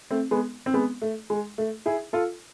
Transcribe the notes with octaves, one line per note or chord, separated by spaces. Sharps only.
A3 C4
G#3 B3
C4
G#3 B3
A3
G#3
A3
E4 G#4
F4 A4